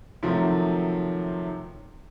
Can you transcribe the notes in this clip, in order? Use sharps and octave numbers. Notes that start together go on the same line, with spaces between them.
C3 D#3 F3 F#3 A3 C4